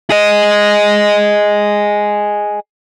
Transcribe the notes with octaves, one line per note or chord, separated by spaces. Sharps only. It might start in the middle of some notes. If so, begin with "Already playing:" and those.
G#4 D#5